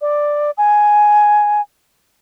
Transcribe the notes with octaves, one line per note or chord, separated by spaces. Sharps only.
D5
G#5